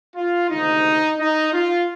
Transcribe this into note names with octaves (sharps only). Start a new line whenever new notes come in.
F4
D2 C3 D#3 G#3 D#4
D#4
F4